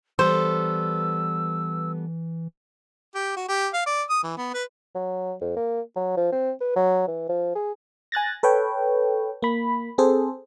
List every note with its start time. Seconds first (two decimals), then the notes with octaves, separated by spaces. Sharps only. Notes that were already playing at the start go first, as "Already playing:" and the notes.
0.19 E3 G3 B3 A4 C5 E6
3.15 G4
3.37 F#4
3.49 G4
3.74 F5
3.86 D5
4.10 D#6
4.24 E3
4.38 B3
4.54 B4
4.95 F#3
5.41 F2
5.56 A#3
5.96 F#3
6.17 F3
6.32 C4
6.61 B4
6.76 F#3
7.07 E3
7.29 F3
7.55 G#4
8.12 G#5 F#6 A6 A#6
8.43 A4 B4 C#5 G5
9.42 A#3 B5
9.98 C4 G#4 A4 C5